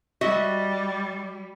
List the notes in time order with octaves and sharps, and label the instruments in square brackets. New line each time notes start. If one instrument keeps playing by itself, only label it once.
[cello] G3 [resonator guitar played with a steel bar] F#4 D#5 E5